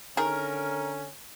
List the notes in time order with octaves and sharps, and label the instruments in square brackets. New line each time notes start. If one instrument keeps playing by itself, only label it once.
[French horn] D3 [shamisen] D#3 G#4 [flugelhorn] C#4 [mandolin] A#4